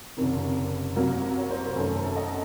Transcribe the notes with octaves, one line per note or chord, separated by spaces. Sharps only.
F#1 F2 C3 D#3 A#4
C2 C3 F#3 A#3
C#5
C5
A#4
F#2 D#3 A3 C#4 A4
A4
D#5 F#5